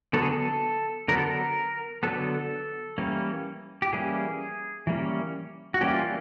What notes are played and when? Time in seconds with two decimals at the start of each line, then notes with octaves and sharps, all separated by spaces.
0.13 D3 F#3 B3 A4
0.22 G#4
0.31 A4
1.08 D3 F#3 B3 A#4
1.17 A4
1.25 A#4
2.03 D3 F#3 B3 A4
2.98 E3 G3 A#3 C#4
3.82 G4
3.93 E3 G3 A#3 C#4 G#4
4.87 E3 G3 A#3 C#4
5.74 F#4
5.81 E3 G3 A#3 C#4 G4
5.94 F4